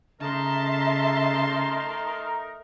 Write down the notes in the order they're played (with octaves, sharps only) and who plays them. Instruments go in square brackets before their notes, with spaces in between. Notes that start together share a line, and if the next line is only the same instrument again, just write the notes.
[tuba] C#3 [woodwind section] A3 D#4 A#4 [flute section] D#5 E5 [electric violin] A5 C6